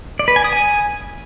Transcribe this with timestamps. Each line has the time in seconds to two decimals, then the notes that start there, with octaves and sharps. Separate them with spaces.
0.19 D5
0.28 B4
0.36 G#5
0.44 D#6
0.53 G#5